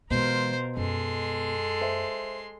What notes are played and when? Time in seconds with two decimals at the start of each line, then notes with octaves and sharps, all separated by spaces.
0.11 B2 E3 G#3 F4 A#4 C5
0.77 F#2 G#3 A4 C6
1.81 C5 E5